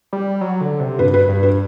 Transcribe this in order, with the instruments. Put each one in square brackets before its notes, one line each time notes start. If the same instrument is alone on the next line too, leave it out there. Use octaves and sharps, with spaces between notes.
[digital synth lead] G3
F#3
D3
C3
[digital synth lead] G2 [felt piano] B4
[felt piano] B4
[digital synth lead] G2
[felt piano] B4